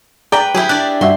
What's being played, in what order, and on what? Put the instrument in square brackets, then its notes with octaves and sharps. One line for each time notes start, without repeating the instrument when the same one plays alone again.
[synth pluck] G#4 D5 A#5 [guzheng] B4 G5
[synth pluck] F#3 [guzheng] E4 G4 G#4
[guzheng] D4 D5 [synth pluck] F#6
[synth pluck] G2 F#4 E5 [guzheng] C6